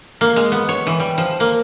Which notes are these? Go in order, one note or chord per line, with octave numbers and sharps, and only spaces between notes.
A#3
G#3
B3
C#5
E3
G3
F3
A#3